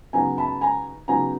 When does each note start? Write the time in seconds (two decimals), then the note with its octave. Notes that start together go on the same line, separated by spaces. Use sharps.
0.13 C#3 F#3 B3 D#4 G#5 A#5
0.38 A5 B5
0.61 G#5 A#5
1.08 C#3 F#3 B3 D#4 G#5 A#5